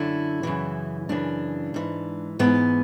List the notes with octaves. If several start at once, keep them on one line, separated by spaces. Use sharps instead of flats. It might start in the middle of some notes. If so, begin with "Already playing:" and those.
Already playing: F#2 D3 E4
F#2 C#3 E3
F#2 C#3 E3 D4
G#2 E3
G#2 E3 B3